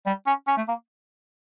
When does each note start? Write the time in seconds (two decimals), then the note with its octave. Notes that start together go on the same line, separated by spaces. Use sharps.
0.06 G3
0.27 C#4
0.47 C#4
0.57 A3
0.68 A#3